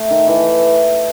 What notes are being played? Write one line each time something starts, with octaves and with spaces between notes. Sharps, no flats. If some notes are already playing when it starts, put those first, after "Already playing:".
Already playing: A3
D#3
E3